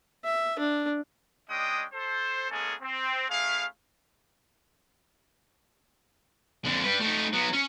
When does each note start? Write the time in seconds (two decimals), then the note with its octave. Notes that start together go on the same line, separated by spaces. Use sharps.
0.25 E5
0.59 D4
1.49 G#3 C#4 D4 D#5 G5 D#6
1.93 A4 C5
2.50 G#3 A#3 B3 C#4 G#4 A4
2.81 C4
3.29 A3 C#4 E4 G#4 F5
6.65 F2 D3
6.85 G3 B4
7.01 A3 D#4
7.33 F#3 B3
7.53 C#4